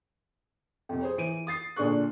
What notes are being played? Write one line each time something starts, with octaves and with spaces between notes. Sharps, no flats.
F2 C3
G#4 C5 C#5
E3 D7 D#7
D#6 A6 C7
A#2 D3 D4 G#4 C#6 F#6